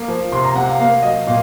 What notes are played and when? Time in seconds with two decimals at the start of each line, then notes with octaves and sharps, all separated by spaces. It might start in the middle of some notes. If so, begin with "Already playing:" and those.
Already playing: A#3
0.08 F3
0.32 C3 C6
0.44 A#5
0.55 C3 F#5
0.68 F5
0.79 A#3 F5
1.02 F#3 D#5
1.27 A#2 F5